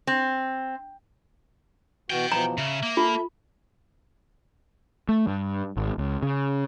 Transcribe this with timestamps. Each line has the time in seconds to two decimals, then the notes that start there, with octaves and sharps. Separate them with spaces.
0.07 C4
2.10 B2 E3 F#4 D#5 G5
2.32 B2 E3 F3 A#5
2.58 C#3 E5
2.83 A#3
2.97 F4 A4 E5
5.09 A3
5.27 G2
5.77 G#1
5.98 C#2
6.23 C#3